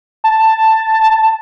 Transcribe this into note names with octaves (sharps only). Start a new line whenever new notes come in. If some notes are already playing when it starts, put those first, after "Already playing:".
A5